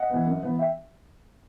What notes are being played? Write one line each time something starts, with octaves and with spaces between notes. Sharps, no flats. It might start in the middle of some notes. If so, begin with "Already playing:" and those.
Already playing: D#5 F#5
E3 B3
F#2
E3 B3
E5 G5